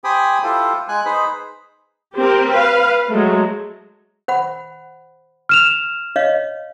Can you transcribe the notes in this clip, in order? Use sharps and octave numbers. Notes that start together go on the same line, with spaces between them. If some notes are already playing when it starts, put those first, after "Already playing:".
G4 C5 G5 G#5 B5 D#6
E4 F4 G4 A4 C5
G#3 G#5 F#6
D#4 G#4 B4 C5 B5
C4 G4 A#4
B4 F5
F#3 G#3 A3
C5 F#5 B5
F6 E7 F7
C#5 D#5 F5